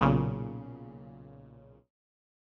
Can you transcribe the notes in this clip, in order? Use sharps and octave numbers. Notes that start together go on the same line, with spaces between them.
B1 A#2 C#3